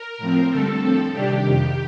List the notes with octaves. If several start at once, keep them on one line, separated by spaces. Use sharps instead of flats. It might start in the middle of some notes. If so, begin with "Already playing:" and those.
Already playing: A#4
A2 F3 C4
G2 D3 A3 C4 A4
A2 F3 C4
C3 D#3 G3 D4 G4
F2 C3 D#3